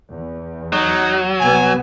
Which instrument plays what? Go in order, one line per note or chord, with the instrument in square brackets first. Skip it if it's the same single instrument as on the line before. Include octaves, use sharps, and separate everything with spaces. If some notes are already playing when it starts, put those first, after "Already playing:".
[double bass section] E2
[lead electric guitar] F#3 [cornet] D#4
[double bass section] C2 B3 [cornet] G#5